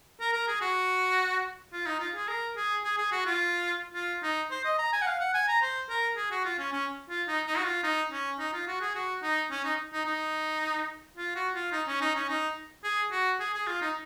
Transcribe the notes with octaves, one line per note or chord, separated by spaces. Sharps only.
A#4
A#4
G#4
F#4
F4
D#4
F4
G#4
A#4
G#4
G#4
G#4
F#4
F4
F4
D#4
C5
D#5
A#5
G#5
F#5
F5
F#5
G#5
A#5
C5
A#4
G#4
F#4
F4
C#4
C#4
F4
D#4
D#4
F#4
F4
D#4
C#4
D#4
F4
F#4
G#4
F#4
D#4
C#4
D#4
D#4
D#4
F4
F#4
F4
D#4
C#4
D#4
C#4
D#4
G#4
F#4
G#4
G#4
F4
D#4